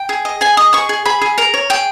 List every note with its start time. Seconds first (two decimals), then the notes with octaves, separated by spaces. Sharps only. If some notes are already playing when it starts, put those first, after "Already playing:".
Already playing: G5
0.09 G#4
0.25 D#5
0.41 G#4 G#5
0.57 D#5 D#6
0.73 G#4 C#6
0.89 G#4
1.05 G#4 B5
1.22 G#4
1.38 A#4 A#5
1.54 C#5
1.70 G#4 G5